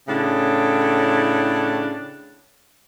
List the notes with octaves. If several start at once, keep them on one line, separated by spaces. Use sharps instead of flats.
A2 C#3 D4